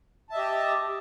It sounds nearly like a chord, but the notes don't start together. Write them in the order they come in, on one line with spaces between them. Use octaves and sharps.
A5 E5 D#5 G4